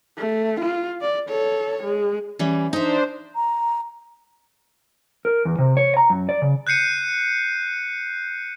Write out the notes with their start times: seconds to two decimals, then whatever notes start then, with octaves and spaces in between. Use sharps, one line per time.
0.19 A3
0.61 F4
1.01 D5
1.30 A4 C#5
1.84 G#3
2.39 E3 G3 C#4
2.73 D4 D#4 C5 E5
3.36 A#5
5.25 A#4
5.45 E2
5.58 C3
5.77 C#5
5.97 A#5
6.10 F#2
6.29 D5
6.42 C#3
6.67 F#6 G6 C7 C#7 D#7